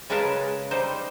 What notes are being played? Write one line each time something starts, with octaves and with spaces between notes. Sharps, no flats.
C#3 G#3 G#4 A#4 B4 A5
G3 D#4 C5